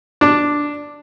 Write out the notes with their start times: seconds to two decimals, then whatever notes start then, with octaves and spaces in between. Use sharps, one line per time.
0.21 D4